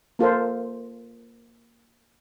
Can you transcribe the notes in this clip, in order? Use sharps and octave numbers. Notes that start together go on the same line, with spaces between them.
A#3 F4 A4 C5